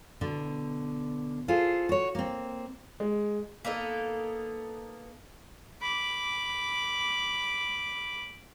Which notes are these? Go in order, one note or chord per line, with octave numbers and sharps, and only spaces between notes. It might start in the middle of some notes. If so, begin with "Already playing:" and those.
B2 D3
F4 G#4 A4 C5
F#4 C#5
A#3 C4
G#3
A#3 B3 D#4 A4
B5 D6